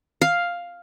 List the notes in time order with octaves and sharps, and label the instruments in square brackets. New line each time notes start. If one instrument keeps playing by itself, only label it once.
[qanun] F5